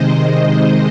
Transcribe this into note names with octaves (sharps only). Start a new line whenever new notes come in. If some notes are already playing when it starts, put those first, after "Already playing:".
Already playing: C3 D#3 G#3 C5 D#5
C5 D#5